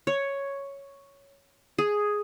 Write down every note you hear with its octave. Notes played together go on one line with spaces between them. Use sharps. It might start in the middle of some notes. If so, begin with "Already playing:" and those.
C#5
G#4